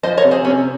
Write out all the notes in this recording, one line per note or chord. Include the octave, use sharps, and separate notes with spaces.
F3 C5 D#5
A#4 C#5
C3
G#4 C5
C3 C#4